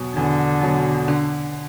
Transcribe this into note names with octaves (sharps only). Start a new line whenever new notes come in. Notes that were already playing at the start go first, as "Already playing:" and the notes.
Already playing: E2 B2 F#3
E2 D3
B2 F#3
D3